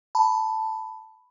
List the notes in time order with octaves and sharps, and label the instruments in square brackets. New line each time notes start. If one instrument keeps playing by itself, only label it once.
[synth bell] A5 B5